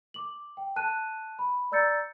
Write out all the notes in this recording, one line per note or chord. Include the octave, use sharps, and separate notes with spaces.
D6 F#7
G5
A5 F#6 D#7
B5
D5 A#5 E6 G6 A6 C#7